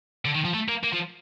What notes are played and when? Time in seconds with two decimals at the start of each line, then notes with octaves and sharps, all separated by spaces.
0.25 D3
0.35 D#3
0.45 F3
0.54 A3
0.69 A#3
0.84 A#3
0.93 F3